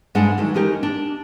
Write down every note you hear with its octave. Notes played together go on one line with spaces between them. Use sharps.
G2 G#3 D4 D5 F#5
D#3 E3 F#3
G#3 C#4 D#4 G4 A#4
D4